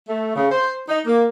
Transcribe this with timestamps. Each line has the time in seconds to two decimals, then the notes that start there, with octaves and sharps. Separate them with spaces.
0.09 A3
0.36 C#3
0.51 C5
0.89 D#4
1.06 A#3